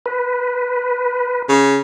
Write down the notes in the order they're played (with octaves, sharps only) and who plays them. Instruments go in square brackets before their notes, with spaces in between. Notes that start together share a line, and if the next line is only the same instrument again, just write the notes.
[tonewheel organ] B4
[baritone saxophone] C#3